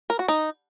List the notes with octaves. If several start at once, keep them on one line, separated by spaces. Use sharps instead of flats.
A#4
F#4
D#4